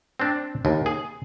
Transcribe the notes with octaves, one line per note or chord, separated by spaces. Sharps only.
C4 D4
D#2
G#4